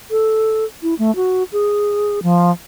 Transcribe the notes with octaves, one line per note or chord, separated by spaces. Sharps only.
A4
E4
A3
F#4
G#4
F3